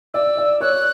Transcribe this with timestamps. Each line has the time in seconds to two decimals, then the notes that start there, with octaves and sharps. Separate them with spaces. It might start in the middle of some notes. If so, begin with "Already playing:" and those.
0.14 D5 E6
0.37 D5
0.61 C#5 F#6